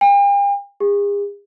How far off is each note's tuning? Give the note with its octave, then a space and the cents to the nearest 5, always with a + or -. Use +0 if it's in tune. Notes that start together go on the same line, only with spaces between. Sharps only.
G5 +45
G#4 -40